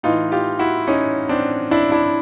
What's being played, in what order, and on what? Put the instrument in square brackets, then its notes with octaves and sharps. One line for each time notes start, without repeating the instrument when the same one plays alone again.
[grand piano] A2 E3 D#4 F4
F4 G4
E4 F#4
C#4 D#4
C4 D4
D4 E4
D4 E4